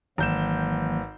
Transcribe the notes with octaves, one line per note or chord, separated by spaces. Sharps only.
G#1 E3 F#3 A#3 G6 E7